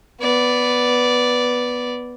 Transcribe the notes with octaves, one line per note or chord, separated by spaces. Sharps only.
B3 D5